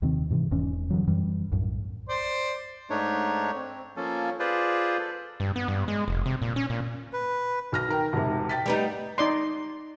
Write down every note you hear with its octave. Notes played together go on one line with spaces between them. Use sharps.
D#2 C3 D#3 C4
G#2 C3 E3
E1 E2 G#2 C#4
G2 D3 E3 F#3
F#2 E3 G3
B1 F#2 A2
C5 D5
G#2 A3 D4 D#4 C#5
C4
F3 A#3 C#4 A4
F4 G#4 B4 C5 D5
A4
G2
B3
G2
G#3
F1
C3
A#2
C#4
A#2
B4
B1 F6 A#6
D#3 A#4 G5
E1 G#2 C3
G5 A6 B6
G3 B3 D#4
D#4 D5 C6